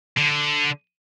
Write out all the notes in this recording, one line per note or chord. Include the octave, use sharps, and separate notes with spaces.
D3